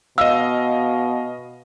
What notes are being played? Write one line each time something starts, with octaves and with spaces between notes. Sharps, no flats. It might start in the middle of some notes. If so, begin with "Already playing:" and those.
B2 D#5 F5 E6